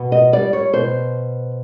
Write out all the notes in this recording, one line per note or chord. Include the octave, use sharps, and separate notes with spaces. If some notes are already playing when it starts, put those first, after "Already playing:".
Already playing: B2
D#5
G3 D5
C#5
B2 C5